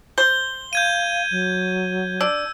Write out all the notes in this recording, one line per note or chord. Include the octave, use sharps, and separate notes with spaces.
C5 G7
F5 G6 G#6 D#7
F#3
D4 E6